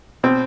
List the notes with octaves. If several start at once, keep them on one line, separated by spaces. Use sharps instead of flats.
B2 C4